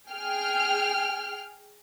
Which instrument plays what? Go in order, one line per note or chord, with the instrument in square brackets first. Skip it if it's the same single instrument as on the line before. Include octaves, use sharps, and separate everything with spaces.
[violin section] G#4 G5 F6